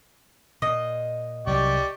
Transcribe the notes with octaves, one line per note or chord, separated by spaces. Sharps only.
A#2 D#5
C2 F#3 G4 D5 C#6